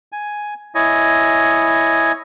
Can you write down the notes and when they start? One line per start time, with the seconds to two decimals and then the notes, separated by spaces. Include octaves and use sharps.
0.12 G#5
0.75 E4 C#5 D#5 G#5